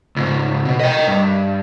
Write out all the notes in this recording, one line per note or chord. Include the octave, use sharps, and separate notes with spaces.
C#2 G#2
B2
D#5 G5
G2